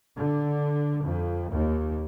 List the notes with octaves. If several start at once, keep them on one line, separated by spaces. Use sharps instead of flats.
D3
F2
D#2